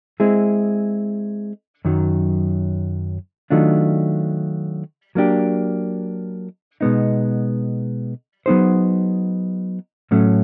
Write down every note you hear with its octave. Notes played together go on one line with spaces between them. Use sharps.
G#3 C4 E4 G#4
F#2 D#3 F#3
D#3 F#3 A3 D4 F4
F#3 A#3 D4 G4
B2 G#3 B3 D#4
F#3 B3 D#4 G#4 C5
A2 F#3 A3 C#4